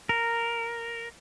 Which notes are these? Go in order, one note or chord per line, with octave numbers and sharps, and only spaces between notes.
A#4